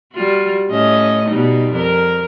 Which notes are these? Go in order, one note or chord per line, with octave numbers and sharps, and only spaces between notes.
G3 F4 F#4
A2 C#4 D#5
B2 G3 D#4
F2 A#4